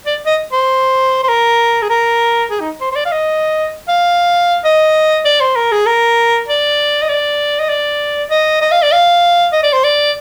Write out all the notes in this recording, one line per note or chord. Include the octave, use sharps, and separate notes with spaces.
D5
D#5
C5
C5
A#4
G#4
A#4
G#4
D#4
C5
C5
D5
F5
D#5
F5
D#5
D5
C5
A#4
G#4
A#4
D5
D#5
D5
D#5
D5
D#5
D#5
F5
D5
F5
D#5
D5
C5
D5